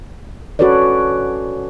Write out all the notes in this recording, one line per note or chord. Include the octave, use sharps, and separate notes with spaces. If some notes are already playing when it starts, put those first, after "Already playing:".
C#4 F#4 A4 B4 C#5 D5